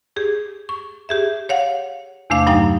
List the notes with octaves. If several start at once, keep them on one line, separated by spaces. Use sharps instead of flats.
G4 G#4
C#6
G4 G#4 E5
C#5 F5 F#5
E2 C3 A3 D4 F5
G2 F#3 D#4 F5 G5 A#5